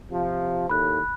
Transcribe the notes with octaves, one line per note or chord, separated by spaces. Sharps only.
C3 F3
D#2 A2 B5 F#6